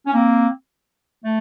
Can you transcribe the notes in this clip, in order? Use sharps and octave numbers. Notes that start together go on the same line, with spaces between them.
C#4
A#3 C4
A3